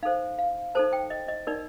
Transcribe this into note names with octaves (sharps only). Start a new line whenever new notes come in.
D#4 A4 C5 F5
F5
D#4 A4 C5 A5
G5
D#5
D#5
D#4 A#4 D5